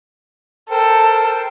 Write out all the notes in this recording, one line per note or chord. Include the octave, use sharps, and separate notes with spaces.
A4 A#4 C5 G5